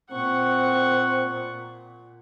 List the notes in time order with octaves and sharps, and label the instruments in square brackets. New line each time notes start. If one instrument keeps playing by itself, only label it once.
[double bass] A#2 [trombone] C4 [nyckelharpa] F#5 C#6